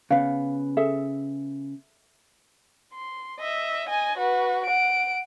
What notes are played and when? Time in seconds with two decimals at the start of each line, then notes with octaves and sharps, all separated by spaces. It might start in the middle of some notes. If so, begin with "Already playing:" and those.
0.11 C#3 B3 F5
0.77 G#4 A4 E5
2.94 C6
3.40 D#5 E5
3.88 D#5 G#5
4.18 F#4 B4
4.66 F#5 D7